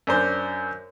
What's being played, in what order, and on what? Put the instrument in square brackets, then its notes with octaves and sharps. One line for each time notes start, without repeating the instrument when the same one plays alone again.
[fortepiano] F#2 D4 C5